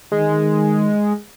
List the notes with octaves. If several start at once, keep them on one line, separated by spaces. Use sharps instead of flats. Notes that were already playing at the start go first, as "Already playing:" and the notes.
D#3 G#3